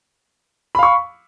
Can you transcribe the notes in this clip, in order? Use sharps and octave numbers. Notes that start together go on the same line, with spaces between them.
F5 B5 C#6